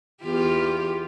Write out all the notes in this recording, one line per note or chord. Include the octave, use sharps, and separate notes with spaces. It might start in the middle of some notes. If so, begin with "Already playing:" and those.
E2 F4 G4